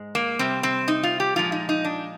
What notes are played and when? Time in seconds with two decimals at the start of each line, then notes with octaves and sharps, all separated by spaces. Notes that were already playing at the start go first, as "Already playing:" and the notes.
Already playing: G#2 G#3
0.15 A#3
0.39 C3 G3 C4
0.63 C4
0.88 D#4
1.03 F4
1.20 G4
1.36 A#2 F3 G#3 F4
1.52 D#4
1.69 D#4
1.85 D4